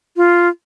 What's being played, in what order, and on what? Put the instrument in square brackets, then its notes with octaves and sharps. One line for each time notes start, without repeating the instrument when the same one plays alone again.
[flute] F4